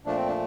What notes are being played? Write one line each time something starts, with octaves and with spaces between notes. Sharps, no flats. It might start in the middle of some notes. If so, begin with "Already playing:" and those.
A#2 F3 A3 D4
C4
D4